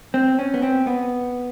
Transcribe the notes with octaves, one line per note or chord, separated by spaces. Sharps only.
C4
C#4
B3
C4
B3